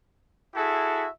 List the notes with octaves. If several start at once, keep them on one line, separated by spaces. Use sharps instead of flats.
E4 F#4 G#4 A4 E5